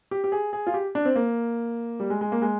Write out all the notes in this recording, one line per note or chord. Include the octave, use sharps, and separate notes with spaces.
G4
G4
G#4
G#4
F4
G4
D4
C4
A#3
G3
G#3
G#3
A#3
G#3